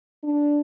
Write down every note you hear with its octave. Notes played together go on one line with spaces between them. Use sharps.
D4